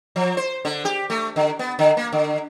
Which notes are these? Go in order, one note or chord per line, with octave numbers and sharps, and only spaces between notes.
F3
C5
D3
G4
A3
D3
B3
D3
A#3
D3